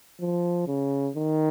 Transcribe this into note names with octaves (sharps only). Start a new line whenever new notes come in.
F3
C#3
D#3